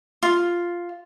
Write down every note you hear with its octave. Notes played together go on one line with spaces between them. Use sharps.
F4